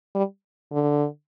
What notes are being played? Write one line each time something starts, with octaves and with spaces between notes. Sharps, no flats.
G3
D3